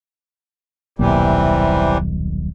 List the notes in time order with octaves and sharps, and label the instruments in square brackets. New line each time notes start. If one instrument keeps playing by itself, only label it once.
[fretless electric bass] D#1 B1 A#3 [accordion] C3 E3 G3